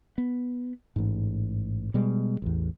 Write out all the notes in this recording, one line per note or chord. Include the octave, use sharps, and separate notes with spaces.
B3
A1 G#2
B2 G3 G#3
A1 E2